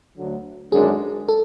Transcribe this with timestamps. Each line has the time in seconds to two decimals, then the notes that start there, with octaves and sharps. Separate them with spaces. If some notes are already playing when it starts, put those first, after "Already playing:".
0.17 D2 D3 F#3
0.72 G#1 F#2 D3 G#3 D4 G#4
1.29 A4